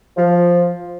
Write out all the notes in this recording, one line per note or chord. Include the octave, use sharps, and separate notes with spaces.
F3